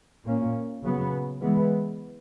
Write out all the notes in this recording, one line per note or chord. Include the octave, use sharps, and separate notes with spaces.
A#2 A#3 C#4
C#3 F#3 B3
E3 G#3 B3